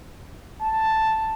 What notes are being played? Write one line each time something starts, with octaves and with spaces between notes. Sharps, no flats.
A5